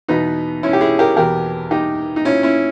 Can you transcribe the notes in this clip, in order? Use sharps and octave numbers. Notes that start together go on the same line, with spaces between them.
E2 B2 B3 D#4
C#4 E4
G4
E4 G#4
G4 A#4
E2 B2 G4 A#4
D#4 G4
D#4
A#2 C#4 E4
C#4 E4